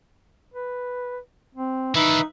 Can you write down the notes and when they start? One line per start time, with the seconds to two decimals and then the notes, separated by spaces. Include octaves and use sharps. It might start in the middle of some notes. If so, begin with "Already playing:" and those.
0.54 B4
1.55 C4
1.95 D#3 E3 D#4 B4 E5